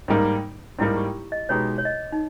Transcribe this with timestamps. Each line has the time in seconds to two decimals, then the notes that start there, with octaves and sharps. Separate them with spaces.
0.08 G#2 G3 A#3 D#4 A#4
0.79 G#2 G3 A#3 D#4 E4 A#4
0.96 G4
1.32 D#5
1.49 B2 G#3 D#4 G4 B4 C#5
1.78 C#5
1.85 D#5
2.12 D#4